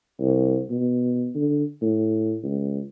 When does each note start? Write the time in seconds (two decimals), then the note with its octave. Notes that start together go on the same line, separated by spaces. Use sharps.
0.20 C2
0.70 B2
1.35 D3
1.82 A2
2.43 C#2